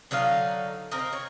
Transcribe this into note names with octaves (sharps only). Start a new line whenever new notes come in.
D3 F#3 D#4 F5
C4 A#4 D#5
C#5